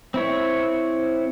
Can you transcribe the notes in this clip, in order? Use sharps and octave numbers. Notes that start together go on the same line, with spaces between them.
C4 E4 C#5